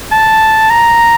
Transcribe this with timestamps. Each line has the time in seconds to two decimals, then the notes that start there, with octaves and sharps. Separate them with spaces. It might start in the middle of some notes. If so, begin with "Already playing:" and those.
0.12 A5
0.70 A#5